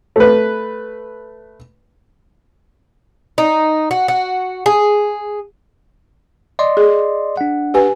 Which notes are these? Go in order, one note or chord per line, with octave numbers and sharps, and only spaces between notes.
A3 B4
D#4
F#4
F#4
G#4
D5 D#5 C6
G#4
D4 F#5
G4 B4 G#5